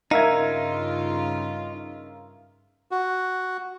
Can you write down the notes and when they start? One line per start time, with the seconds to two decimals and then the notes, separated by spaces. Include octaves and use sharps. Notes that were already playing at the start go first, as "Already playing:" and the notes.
0.11 G2 C#3 D#4 F4 A#4 E5 F5 G#6
2.91 F#4